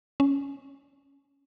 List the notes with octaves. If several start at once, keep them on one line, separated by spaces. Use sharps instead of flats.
C#4